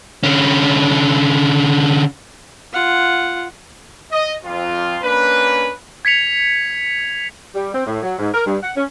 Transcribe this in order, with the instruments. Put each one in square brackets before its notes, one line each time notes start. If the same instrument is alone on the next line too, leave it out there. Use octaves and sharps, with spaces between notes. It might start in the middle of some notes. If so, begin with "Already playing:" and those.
[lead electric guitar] D3 C#4
[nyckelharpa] F4 F#5
[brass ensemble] D#5
F2 F4
A#3 C#4 D4 B4
[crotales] G#6 B6 C#7 F7
[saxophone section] G3
C4
A2
F#3
G#2
A#4
G2
F#5
C#4